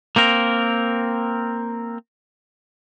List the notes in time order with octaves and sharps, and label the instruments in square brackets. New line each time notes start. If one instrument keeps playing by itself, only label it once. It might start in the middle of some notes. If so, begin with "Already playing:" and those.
[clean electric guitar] A#3 C4 A#4